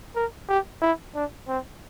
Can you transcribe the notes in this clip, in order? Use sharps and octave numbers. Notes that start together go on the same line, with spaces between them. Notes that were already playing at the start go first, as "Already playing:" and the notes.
A#4
G4
E4
D4
C4